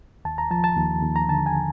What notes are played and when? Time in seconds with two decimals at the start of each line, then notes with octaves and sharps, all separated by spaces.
0.25 D#2 A5
0.38 A#5
0.51 F3 A5
0.64 A5
0.77 D#2
1.03 D#2
1.16 A#5
1.28 D3 A5
1.46 G#5